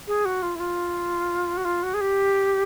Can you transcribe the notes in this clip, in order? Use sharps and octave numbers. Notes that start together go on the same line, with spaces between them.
G#4
F#4
F4
E4
F4
F#4
F4
F#4
G#4
G4